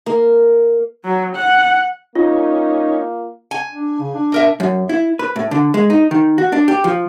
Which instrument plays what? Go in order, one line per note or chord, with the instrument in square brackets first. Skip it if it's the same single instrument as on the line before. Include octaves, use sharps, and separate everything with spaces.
[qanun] A#3
[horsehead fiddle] F#3
F#5
[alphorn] A#3 [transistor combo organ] C#4 D#4 [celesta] F4
[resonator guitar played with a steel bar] G#5
[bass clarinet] D4
C#3
D4
[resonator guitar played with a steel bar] B2 A#4 E5
[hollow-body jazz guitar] F#2
E4
B4
A2
D3
G#3
D#4
D#3
F#4
D4
G4
F3